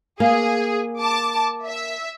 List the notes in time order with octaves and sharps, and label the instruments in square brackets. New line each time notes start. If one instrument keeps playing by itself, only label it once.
[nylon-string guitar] A#3 [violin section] G#4 [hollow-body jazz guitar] F5
[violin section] A5 D6
E5